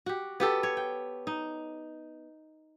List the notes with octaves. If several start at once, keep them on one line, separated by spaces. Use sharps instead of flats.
F#4 G4
B3 G4 A4
C#5
G5
D#4